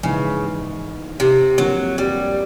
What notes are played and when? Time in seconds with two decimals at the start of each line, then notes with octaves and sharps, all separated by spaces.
0.03 A#1 G#2 C#3 E3
1.20 C3
1.58 F2 D3 F3 F#3 A#3
1.98 G3